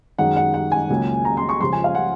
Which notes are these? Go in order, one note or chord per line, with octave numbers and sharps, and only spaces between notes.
F#2 D#3 G#3 F#5
F#5
F#5
G#5
C#2 C#3 F#3 A#3
A#5
C6
C#6
C#2 C#3 F3 G#3 C6
G#5
F5
F#5